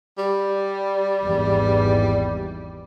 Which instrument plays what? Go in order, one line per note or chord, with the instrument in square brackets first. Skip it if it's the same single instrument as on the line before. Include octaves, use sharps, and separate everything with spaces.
[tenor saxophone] G3
[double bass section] G#1 E2 E3